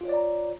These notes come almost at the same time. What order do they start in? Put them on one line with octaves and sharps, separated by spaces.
F4 C#5 D5 A#5